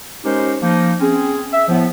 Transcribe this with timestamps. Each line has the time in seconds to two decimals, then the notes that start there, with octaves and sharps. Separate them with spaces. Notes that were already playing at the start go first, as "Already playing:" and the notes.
0.25 G#3 C#4 D#4 G4 A#4 C5
0.62 F3 A#3 D#4
1.01 C4 C#4 G#4
1.52 E5
1.69 A2 F3 B3